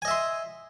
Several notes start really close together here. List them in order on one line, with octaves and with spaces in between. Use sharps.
G#5 D#5 E5 C6